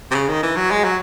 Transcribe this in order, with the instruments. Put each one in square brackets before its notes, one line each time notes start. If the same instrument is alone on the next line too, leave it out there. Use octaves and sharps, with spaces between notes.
[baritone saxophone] C3
C#3
D#3
E3
F#3
G#3
F#3